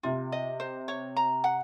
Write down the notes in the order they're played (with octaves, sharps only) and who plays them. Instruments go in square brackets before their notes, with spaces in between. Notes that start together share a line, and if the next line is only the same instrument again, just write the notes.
[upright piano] C3 [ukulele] F4
[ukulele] D#5
C5
C#5
A#5
F#5